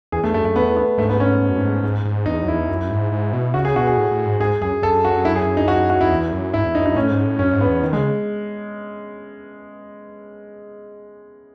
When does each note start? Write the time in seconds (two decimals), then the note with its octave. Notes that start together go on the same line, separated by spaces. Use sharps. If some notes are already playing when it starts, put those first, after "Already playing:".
0.12 E2 G#4
0.24 E2 A3
0.34 F#2 A3
0.45 F#2 A3
0.56 E2 B3
0.77 B3
0.98 G#2 A3
1.09 B3
1.20 C#4
1.41 G#2
1.50 F#2
1.58 G#2
1.83 G#2
2.05 G#2
2.26 E2 D#4
2.43 F#2
2.48 E2 E4
2.69 F#2
2.91 G#2
3.12 G#2
3.33 B2
3.54 C#3 F#4
3.65 G#4
3.75 B2 F#4
3.87 G#4
3.97 A2
4.11 A2
4.26 G#2
4.40 G#2 G#4
4.61 F#2 G#4
4.82 F#2 A4
5.05 F#4
5.25 E4
5.36 G#4
5.57 D#4
5.68 F#4
5.90 F#4
6.01 F#2 E4
6.11 E2
6.32 F#2
6.53 G#2 E4
6.64 E2
6.75 F#2 D#4
6.86 D#4
6.96 A2 C#4
7.10 G#2
7.25 A2
7.39 F#2 C#4
7.53 G#2
7.61 B3
7.67 E2
7.83 D#3
7.93 G#3
7.97 C#3